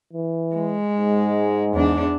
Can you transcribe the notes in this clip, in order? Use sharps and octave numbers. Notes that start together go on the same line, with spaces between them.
E3
G#3
G#2
E2 D4